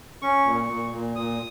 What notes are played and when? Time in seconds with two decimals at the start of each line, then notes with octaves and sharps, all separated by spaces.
0.22 C#4 C#6
0.46 A#2
0.69 A#2
0.92 A#2
1.16 A#2 D#6